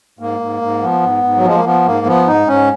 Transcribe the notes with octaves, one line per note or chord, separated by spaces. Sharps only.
G#2 A#3
G#2
G#2
F3 B3
G#2
G#2
F#3
F3 G#3
A#3
F3 B3
G#2 A#3
F3 B3
G#2 D#4
G#2 C#4